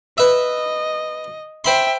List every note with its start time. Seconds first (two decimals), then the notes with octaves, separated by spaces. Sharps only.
0.18 B4 D#5 E5
1.65 C5 E5 G5 B5 C6